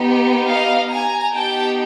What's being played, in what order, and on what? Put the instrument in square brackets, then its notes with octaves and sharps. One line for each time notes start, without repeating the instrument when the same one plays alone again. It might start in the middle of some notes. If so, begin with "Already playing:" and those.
Already playing: [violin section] B3 D#4 G4
D#5 F5
G#5 A#5
B3 D#4 G4 G5 A5